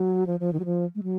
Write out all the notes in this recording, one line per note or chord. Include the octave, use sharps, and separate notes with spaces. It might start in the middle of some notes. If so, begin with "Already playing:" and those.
Already playing: F#3
F3
F3
D#3
F#3
F3
G#3
F#3